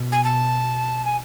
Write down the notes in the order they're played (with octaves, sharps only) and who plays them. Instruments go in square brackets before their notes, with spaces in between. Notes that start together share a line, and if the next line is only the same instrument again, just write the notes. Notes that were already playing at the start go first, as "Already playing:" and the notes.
Already playing: [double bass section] B2
[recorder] G#5
A5
G#5